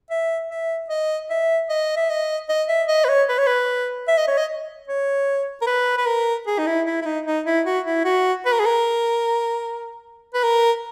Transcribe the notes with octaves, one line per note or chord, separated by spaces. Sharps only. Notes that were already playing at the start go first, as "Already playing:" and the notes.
E5
E5
D#5
E5
D#5
E5
D#5
D#5
E5
D#5
B4
C#5
B4
C#5
B4
E5
D#5
C#5
D#5
C#5
A#4
B4
B4
A#4
G#4
D#4
E4
E4
E4
D#4
D#4
E4
F#4
E4
F#4
B4
A#4
G#4
A#4
B4
A#4